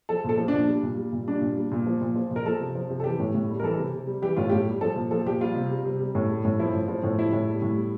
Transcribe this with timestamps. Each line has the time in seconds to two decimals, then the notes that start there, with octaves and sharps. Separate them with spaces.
0.09 F3 A4
0.24 A#2 A4
0.38 F3
0.48 A#2 D4
0.68 G3
0.83 A#2
0.97 G3
1.13 A#2
1.28 G3 D4
1.41 A#2
1.57 G3
1.71 A#2
1.86 F3
2.02 A#2
2.15 F3
2.31 A#2 A#4
2.45 F3 A4
2.60 C3
2.75 F3
2.90 C3
3.00 A4
3.04 E3 G4
3.20 A2
3.35 A2
3.49 G3
3.60 A#4
3.63 E3 A4
3.79 C3
3.94 C3
4.07 G3
4.22 E3 G4
4.37 A2 F4
4.49 A2 G4
4.67 G3
4.81 F3 A4
4.96 A#2
5.11 F3 A4
5.25 A#2 G4
5.41 G3 F4
5.55 C3
5.71 G3
5.85 C3
5.99 G3
6.15 A2
6.29 G3
6.45 A2
6.59 F3 E4
6.73 A2
6.88 F3
7.03 A2
7.18 G3 E4
7.33 A2
7.48 G3
7.62 A2
7.77 G3